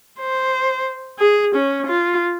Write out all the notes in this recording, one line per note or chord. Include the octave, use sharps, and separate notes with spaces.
C5
G#4
C#4
F4